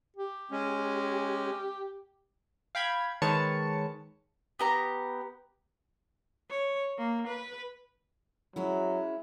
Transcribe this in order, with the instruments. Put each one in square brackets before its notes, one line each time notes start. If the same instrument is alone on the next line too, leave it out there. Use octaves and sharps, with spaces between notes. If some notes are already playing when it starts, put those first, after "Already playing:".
[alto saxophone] G4
[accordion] G#3 C#4
[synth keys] F5 G5 B5 G#6
D#3 G#3 B4 C#5 A5 C#7
[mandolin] B3 G4 A#5
[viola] C#5
A#3
B4
[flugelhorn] F#3 [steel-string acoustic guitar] G#3 C#4 E4